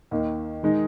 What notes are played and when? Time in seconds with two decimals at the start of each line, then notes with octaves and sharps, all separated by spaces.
0.11 D#2 D#3 A#3
0.63 D#3 G#3 D#4